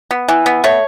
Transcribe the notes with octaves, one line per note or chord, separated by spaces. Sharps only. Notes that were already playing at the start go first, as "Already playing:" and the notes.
B3
E3
B3
A3 C#5